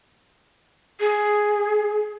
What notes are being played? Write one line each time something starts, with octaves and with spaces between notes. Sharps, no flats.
G#4